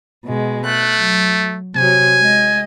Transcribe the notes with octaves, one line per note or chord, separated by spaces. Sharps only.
B2 G#3
A3 F#6
F#3
C3 F#3 G#5
G#3 D#5